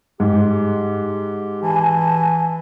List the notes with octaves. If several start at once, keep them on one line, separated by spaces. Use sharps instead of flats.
G#2 G4
E3 G#5 A5